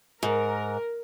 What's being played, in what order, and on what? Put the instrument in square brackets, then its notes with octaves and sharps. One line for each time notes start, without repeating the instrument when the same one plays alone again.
[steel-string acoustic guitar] G#2 [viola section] A#4